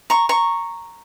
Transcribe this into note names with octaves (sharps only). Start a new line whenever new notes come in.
A#5 C#6
A#5 C#6